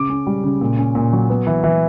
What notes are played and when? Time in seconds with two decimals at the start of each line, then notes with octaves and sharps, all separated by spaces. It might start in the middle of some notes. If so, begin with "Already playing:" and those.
Already playing: C#3 D6
0.10 C#4
0.27 G3
0.43 C#3
0.61 A#2
0.79 C#4
0.95 A#2
1.13 F#3
1.30 B3
1.47 E3
1.64 E3